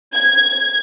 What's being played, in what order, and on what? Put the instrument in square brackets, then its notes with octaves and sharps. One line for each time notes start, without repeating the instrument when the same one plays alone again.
[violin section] G#6